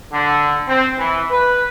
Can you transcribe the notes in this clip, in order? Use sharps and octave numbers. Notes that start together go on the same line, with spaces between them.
D3
C4
E3
B4